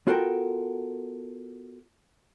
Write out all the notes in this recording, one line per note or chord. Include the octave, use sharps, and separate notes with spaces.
B3 F4 F#4 A4 A#4 G5